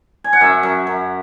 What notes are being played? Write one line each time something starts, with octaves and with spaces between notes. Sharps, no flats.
G#5
F#5
F#2 E5
F#2
F#2